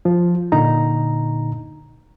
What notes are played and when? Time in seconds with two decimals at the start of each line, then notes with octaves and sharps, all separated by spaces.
0.05 F3 F4
0.52 A#2 D3 D#4 A#5